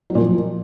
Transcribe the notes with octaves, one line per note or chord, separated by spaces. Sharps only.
F#3
A#2
F3